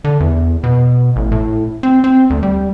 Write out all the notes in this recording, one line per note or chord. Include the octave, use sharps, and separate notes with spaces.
D3
E2
B2
A1
A2
C4
C4
D2
G3